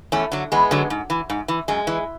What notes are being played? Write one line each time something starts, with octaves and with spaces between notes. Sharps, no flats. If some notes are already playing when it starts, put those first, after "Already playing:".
E2 A3 C#4
D3 F#3
E2 G#3 B3
D3 F#3
G#2
E3
G#2
E3
F#2 G#3
E3